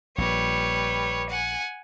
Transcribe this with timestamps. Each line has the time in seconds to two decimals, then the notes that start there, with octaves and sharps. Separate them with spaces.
0.18 A#1 A#2 G3 B4 C#5
1.30 F#5 G#5